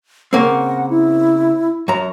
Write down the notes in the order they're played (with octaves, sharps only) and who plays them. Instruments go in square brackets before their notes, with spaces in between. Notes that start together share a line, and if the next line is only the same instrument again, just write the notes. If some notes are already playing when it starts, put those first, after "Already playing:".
[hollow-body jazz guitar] C#3 A#3 C4 [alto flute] F#5
[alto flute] E4
[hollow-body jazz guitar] F#2 A#5